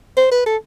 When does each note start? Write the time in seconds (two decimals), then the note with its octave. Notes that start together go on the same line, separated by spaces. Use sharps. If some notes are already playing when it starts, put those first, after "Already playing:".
0.17 C5
0.31 B4
0.46 A4